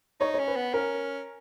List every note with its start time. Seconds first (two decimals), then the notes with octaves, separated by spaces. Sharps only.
0.20 D#4 C#5
0.34 C#4 C#5
0.47 B4
0.56 B3
0.74 C#4 A#4